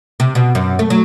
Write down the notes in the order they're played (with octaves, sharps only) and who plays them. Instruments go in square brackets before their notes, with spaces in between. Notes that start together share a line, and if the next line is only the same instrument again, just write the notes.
[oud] C3
B2
F#2
A3
F#3